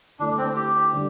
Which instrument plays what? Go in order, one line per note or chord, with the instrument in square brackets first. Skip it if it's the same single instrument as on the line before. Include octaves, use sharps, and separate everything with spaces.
[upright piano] D3 A3 E4 [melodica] D4
[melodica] C4
G4
[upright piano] D3 G3